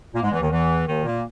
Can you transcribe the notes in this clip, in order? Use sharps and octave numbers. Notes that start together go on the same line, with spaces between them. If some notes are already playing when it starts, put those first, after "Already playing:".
A#2 A#3
G#2 G#3
E2 E3
D#2 D#3
E2 E3
D#2 D#3
A#2 A#3